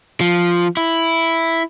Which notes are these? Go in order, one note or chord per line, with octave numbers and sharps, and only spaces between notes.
F3
E4